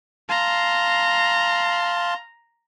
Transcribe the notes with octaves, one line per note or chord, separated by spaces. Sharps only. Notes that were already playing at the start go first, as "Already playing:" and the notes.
F5 A5 A#5 C6